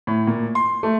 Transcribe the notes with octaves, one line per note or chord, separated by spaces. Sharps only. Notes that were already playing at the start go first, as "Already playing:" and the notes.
A2
A#2
C6
A3